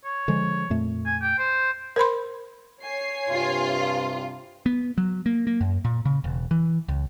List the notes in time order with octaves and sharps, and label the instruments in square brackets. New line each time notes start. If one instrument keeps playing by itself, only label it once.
[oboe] C#5
[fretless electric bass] D3 F3 G#3
F2 A#2 A3
[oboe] G#5
G5
C5
[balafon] A#4 C5 B5 C6
[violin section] C#5 G#5 C7
[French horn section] G2 C3 [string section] F4
[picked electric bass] B3
F#3
A#3
A#3
F#2
A#2
C#3
E1
E3
C#2